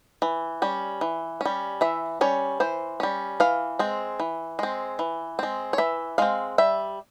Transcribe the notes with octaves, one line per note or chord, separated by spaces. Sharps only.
E3
G3 C#4
E3
G3 C#4
E3 E5
G3 C#4 C#5
E3 C5
G3 C#4
E3 F5
G#3 C4
E3
G#3 C4
E3
G#3 C4
C#5
E3 E5
G#3 C4 F5
G3 E5